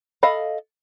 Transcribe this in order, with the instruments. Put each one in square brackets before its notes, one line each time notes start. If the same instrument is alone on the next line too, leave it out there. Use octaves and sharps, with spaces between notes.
[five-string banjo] A4 D#5 F5 B5